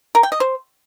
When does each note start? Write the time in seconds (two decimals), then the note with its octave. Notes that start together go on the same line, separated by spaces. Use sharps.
0.15 A#4
0.23 G5
0.32 D#5
0.40 C5